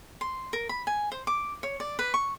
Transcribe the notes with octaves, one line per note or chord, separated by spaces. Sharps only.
C6
A#4
B5
G#5
C5
D6
C#5
D5
B4
C#6